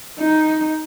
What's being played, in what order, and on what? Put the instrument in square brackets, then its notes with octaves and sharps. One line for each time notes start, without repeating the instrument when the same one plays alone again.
[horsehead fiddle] D#4